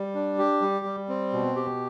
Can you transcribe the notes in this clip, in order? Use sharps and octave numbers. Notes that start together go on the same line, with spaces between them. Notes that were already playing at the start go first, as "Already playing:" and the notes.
Already playing: G3
D4
G4
G3
G3
C4
B2
G4